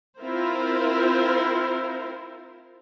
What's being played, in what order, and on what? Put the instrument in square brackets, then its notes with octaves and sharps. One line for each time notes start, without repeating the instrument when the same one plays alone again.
[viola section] C4 E4 F4 A#4 C5